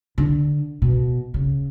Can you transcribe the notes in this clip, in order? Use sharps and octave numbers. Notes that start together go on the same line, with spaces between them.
D3
B2
C#3